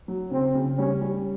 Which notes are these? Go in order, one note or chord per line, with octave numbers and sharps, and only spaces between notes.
F#3
C#3 C4
C#3
G3 C#4
G3